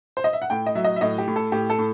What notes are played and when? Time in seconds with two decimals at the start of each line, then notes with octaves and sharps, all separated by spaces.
0.17 C5
0.24 D#5
0.33 E5
0.42 F#5
0.50 A2 G5
0.66 D#5
0.75 F#3 E5
0.84 D#5
0.96 E5
1.01 A2 D#5
1.18 G4
1.28 A2
1.36 A4
1.52 A2 G4
1.70 A4
1.78 A2